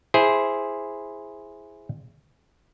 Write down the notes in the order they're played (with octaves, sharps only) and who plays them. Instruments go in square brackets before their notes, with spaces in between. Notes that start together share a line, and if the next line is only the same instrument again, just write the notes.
[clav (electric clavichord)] E4 G#4 C5